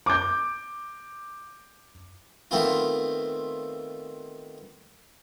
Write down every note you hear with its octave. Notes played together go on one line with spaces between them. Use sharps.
D6 G6
D#3 A3 B3 C4 E4 F4